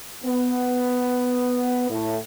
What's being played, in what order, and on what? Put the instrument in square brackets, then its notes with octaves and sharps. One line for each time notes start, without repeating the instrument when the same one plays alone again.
[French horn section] B3
A2